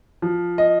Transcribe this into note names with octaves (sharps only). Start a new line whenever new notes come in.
F3
D#5